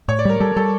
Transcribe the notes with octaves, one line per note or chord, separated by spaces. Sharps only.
A2 C#5
D5
G3 A#4
G3 A4
G3 A4